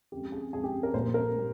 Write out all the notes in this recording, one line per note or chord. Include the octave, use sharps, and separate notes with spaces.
F2 C#3 G#3 G4
G#4
F2 C#3 G#3 G#4
G4
A#4
A#1 A#2 G3 A#3 C5
A#4
A#2 G3